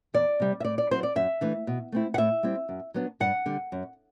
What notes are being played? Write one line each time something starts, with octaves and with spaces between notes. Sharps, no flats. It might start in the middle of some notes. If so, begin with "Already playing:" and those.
E2 D5
C3 G3
E5
A2 D5
D5
F#3 C4 E4 C5
D5
F#2 E5
E3 A3 D4
B2
A3 C4 E4
F#5
A2 E5
G3 C4 E4
F#2
F#3 B3 D4
G2 F#5
D3 G3
F#2